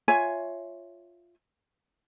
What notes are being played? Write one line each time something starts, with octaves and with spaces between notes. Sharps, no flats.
F4 C#5 E5 G#5